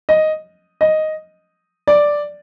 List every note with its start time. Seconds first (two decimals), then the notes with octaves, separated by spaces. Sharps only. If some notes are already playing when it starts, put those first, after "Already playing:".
0.09 D#5
0.81 D#5
1.87 D5